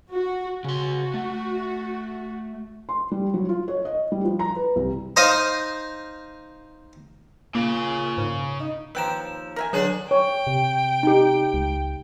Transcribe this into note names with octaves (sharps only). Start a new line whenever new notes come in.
F#4
C#3 F#4 C6
A3
C6
G3
F#3
F4
C#5
D#5
G3
F3
A#5
B4
C2
D#4 C5 D#5 F5 D#6
A#2 C#3 A#3
G#2
D#4
D#2 F3 B4 G5 A#5 E6 G6 E7
A#4 E5 G#5
D3 F#3 G#4 C#5 F#7
C#5 G5
C3
D#4 G4
C#2